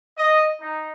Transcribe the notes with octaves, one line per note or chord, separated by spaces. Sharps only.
D#5
D#4